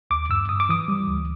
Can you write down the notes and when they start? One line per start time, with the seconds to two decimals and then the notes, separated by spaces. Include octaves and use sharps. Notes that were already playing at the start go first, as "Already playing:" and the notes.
0.11 D#2 D6
0.30 G2 E6
0.49 G2 D#6
0.60 D6
0.69 E3 D#6
0.88 G3
1.07 D2